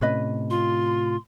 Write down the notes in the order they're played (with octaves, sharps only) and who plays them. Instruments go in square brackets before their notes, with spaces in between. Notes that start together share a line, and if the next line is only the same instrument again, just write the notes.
[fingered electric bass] A2 C3 [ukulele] C#4 B4 D#5
[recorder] F4 [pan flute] C6